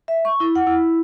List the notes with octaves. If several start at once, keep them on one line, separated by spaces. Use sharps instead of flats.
E5
C#6
E4
F#5
E4